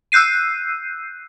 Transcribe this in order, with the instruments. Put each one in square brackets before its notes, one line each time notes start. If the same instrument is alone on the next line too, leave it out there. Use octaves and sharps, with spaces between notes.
[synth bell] E6 F#6 G6 C7 D#7